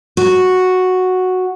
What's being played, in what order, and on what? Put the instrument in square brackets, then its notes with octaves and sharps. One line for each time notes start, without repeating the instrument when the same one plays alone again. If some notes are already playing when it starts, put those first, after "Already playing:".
[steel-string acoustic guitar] F#4